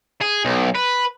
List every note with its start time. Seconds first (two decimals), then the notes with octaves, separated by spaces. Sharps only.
0.21 G#4
0.45 B1
0.75 B4